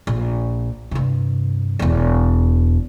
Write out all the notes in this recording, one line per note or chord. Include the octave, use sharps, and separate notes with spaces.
A#1
G2 C3
E1 E2